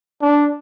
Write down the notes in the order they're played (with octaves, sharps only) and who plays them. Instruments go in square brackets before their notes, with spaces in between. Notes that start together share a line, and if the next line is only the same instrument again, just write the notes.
[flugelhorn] D4